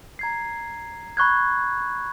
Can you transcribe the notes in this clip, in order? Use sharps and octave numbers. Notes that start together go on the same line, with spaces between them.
A#5 G#6 C7
B5 C#6 F#6 G#6